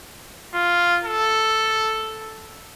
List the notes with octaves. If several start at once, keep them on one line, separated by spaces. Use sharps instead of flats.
F4
A4